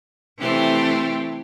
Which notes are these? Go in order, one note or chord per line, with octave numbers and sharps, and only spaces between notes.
C3 E3 A3 C4 G4